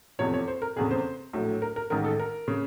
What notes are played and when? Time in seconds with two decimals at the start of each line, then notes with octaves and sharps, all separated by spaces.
0.19 F1 E2 C3 F3 C#5
0.34 C#5
0.48 C5
0.62 A#4
0.76 F1 E2 C#3 G#4
0.91 C5
1.33 A#1 A2 F#3
1.62 A#4
1.76 A#4
1.90 A1 G#2 D#3 A#4
2.05 A4
2.20 A#4
2.48 C#3